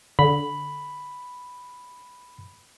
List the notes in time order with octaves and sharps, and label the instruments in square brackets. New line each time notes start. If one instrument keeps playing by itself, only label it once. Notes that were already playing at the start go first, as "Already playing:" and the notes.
[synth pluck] D3 [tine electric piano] B5